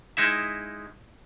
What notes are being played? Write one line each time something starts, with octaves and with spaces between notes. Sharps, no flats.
G#3 D#4 E4 E5